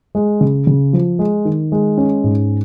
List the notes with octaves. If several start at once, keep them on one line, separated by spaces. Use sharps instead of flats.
G#3
C#3
C#3
F3
G#3
D#3
G#3
C#4
G#2